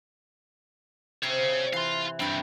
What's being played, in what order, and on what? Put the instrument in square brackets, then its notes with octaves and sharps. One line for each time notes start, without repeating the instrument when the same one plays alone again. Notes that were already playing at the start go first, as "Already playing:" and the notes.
[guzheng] C3 [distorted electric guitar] C#5 F5
[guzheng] E3 [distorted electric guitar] F5 C6
[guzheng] G2 G5 [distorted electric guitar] E3 C4